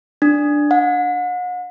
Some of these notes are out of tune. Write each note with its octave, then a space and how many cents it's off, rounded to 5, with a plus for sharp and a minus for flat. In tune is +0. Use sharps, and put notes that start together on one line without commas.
D4 +0
F#5 -40